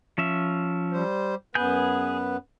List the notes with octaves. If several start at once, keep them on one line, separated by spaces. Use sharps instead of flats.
F3 C#4 E5
G3 C5
F#2 B3 G#4 B4 G#5 G6